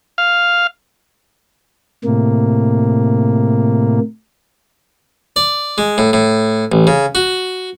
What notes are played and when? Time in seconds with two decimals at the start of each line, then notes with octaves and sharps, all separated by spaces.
0.18 F5
2.04 A2 C3 A#3
5.36 D5
5.78 G#3
5.98 A2
6.13 A2
6.72 A1
6.87 C#3
7.15 F#4